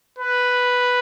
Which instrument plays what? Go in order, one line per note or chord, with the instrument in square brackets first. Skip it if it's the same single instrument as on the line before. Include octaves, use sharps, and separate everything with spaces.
[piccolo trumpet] B4